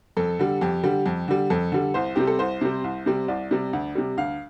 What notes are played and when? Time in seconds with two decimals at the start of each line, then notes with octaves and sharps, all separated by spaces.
0.17 F2 A4
0.39 D3 G3
0.61 F2 G4
0.83 D3 G3
1.06 F2
1.28 D3 G3
1.50 F2 A4
1.72 D3 G3
1.94 C2 C5
2.16 C3 G3 G4
2.27 A4
2.39 C2 C5
2.61 C3 G3
2.84 C2
3.06 C3 G3
3.28 C2 D5
3.51 C3 G3
3.73 D2
3.95 C3 G3
4.17 D2 F5